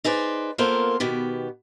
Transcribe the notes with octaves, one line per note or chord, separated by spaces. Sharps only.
D#4 G#4 B4 C5 D5
A#3 B3 F4 A4 A#4 C5
B2 D#3 B3 G4